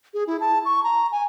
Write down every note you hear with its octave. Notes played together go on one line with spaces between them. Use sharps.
G#4
E4
A5
C#6
A#5
G#5